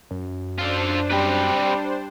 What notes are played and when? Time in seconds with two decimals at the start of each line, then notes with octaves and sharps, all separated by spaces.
0.11 F#2
0.58 D4 F4 A4 C5
1.10 G3 C4 B4